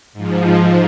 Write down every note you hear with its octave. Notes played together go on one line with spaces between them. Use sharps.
G#2 F3